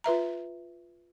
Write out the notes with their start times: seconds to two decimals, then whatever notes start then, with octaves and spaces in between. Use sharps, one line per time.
0.04 F4 B4 E5 A#5